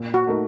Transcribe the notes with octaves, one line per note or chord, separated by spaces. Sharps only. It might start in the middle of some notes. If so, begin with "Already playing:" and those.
Already playing: A#2
F#4
A3 D#4 A#4